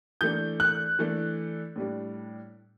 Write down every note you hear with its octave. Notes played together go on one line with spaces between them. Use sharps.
E3 A3 D4 G6
F#6
E3 A3 D4
A2 G3 D4